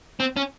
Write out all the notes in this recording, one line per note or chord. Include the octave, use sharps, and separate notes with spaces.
C4
C#4